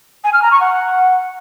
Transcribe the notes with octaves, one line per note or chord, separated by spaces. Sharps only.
G#5
F6
A#5
C#6
F#5